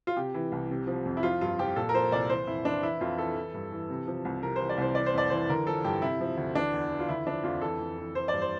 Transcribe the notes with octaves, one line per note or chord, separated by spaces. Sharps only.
F4
C3 G4
E3
C2
C3
F3
F2
E4
F3 F4
G2 F4
F3 G4
A#2 A4
A#4
F3 C5
C2 D5
E3 C5
F2 E4
E3 D4
E3 E4
F2 F4
E3 A4
E3
G2
E3
C3
F3
C2
C3 A#4
E3 C5
D5
C2 C5
E3 D5
C5
F2 D5
E3 C5
D3 A#4
F3 A4
G2 G4
C3 E4
F3
D2
E3 D4
E2
E3
F4
D3 E4
F3 D4
F2 F4
E3 A4
F2
E3
E3 C5
D5
G2
C5